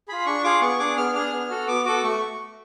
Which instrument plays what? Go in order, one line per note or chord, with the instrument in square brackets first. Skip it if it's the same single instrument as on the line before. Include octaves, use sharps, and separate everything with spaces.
[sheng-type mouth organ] F4 G#4 B5
D4 C#6
F4 G#4 D6
B3 C#6
D4 G#4 D6
B3 F6
D4 G#4 F6
B3
F#4 A4
B3 D6
F#4 A4 D6
A3 C#6